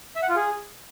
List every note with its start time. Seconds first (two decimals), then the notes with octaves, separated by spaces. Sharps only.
0.16 E5
0.22 F#5
0.29 F4
0.36 G#4